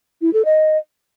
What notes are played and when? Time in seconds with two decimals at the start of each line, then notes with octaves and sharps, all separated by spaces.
0.21 E4
0.33 A4
0.45 D#5